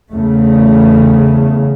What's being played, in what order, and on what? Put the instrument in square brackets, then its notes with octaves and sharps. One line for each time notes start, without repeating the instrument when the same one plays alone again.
[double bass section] E2 C#3 A3